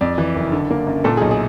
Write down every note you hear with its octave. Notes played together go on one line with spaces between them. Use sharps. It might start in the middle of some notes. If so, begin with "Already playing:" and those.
F2 D5
E3
F#1
D3
A#3
F#2
A#2 A4
G#4
B1
G#4